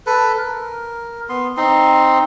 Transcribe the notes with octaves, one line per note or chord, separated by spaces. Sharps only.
A4 B4
A#4
B3 C6
C4 D#4 C6